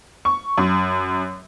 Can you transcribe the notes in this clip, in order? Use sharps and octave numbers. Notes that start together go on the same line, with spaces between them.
C#6
F#2